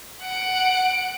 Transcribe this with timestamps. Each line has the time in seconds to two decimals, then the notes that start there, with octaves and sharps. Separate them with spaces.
0.23 F#5 D7